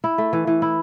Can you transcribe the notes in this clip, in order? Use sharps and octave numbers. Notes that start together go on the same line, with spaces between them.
E4
A3
E3
E3
E4